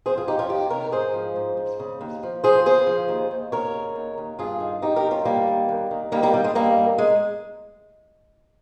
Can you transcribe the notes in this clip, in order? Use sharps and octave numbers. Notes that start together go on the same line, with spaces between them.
F2 G#4 C5
F4 G#4
F2 D#4 G4
C#4 F4
D#3 D#4 G4
C3 A#4 C#5
G#2 G#4 C5
F3
G#2
G#2
C#3
D#2
F3
F3 G#4 C5
C#3 G#4 C5
F3
D#2
D#2
D#2 A#4 C#5
C#3
D#2
D#2
G2 F4 G#4
D#3
G2 D#4 G4
G4 A#4
D#3
C#4 F4
D#3 G3 A#3
D#2
D#2
D#3
D#3 G3 A#3
G3 A#3
D#3 G3
G#3
G2 G3 A#3
G2
G#3